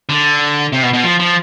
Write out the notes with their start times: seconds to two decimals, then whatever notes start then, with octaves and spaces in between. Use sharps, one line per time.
0.09 D3
0.73 C3
0.83 B2
0.93 B2
1.03 F3
1.19 F3